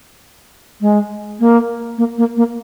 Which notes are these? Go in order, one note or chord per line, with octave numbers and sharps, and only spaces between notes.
G#3
A#3
A#3
A#3
A#3